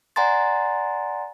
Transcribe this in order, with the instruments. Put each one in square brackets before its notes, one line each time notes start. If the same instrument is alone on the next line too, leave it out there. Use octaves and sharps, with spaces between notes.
[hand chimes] D5 F#5 G#5 A#5 C6 A6